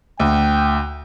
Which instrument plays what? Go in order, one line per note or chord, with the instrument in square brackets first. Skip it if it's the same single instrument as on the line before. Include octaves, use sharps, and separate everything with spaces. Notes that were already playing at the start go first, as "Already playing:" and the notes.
[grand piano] D2 [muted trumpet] G5